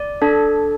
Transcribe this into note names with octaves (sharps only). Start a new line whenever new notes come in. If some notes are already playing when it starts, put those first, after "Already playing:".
Already playing: D5
D4 A4